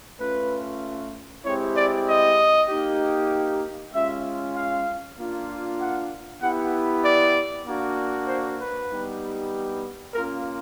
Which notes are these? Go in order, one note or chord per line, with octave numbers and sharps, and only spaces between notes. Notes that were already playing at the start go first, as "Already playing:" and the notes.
A3 C#4 F4 B4
G#3 C4 E4 G4 C#5
D5
D#5
A#3 D#4 G4
G#3 C#4 F4 E5
F5
A#3 D4 F4
F#5
B3 E4 G4 F#5
D5
A#3 D4 F#4
C5
B4
G3 B3 D#4 G4
A#3 C#4 F4 A#4